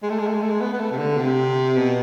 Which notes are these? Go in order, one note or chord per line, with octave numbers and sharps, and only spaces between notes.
G#3
A3
G#3
A3
G#3
A3
G#3
B3
B3
A3
C3
D3
C3
B2